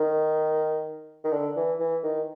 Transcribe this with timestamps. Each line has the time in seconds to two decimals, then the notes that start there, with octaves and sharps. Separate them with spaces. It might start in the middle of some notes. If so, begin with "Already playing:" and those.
Already playing: D#3
1.24 D#3
1.33 D3
1.57 E3
1.80 E3
2.03 D#3